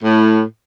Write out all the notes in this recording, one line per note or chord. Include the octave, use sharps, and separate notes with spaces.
A2